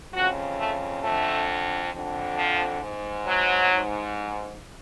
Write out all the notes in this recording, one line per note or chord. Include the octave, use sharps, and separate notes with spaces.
F2 C#3 F#4
A3
F2 D3 A3
F2 D3
F3
G#2
F#3
G#2